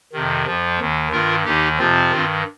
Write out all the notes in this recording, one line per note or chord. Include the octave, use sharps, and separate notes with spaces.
F2 C3 D#3
F2 F3
D#2 D#3
G2 D#3 F4 A#4
D#2 D#3 D#4 G4
F2 C3 F3 C4 F4
G2 D#3